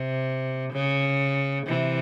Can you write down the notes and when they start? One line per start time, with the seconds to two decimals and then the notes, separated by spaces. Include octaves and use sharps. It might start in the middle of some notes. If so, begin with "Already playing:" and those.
Already playing: C3
0.73 C#3
1.67 C3 E3